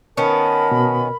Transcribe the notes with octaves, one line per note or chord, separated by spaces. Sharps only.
D#3 B3 C#4 A#4 A5 B5
B2